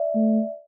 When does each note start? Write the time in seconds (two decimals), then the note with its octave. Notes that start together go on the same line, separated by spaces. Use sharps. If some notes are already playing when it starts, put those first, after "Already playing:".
Already playing: D5 E5
0.15 A3